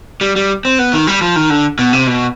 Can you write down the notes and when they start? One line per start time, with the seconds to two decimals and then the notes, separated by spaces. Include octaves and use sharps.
0.21 G3
0.36 G3
0.65 C4
0.79 B3
0.93 D#3
1.07 G3
1.22 F3
1.36 D#3
1.50 D3
1.79 B2
1.93 C3
2.07 B2